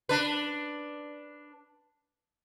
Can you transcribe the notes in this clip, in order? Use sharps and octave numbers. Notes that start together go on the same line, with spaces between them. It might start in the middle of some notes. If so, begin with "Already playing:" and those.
D4 B4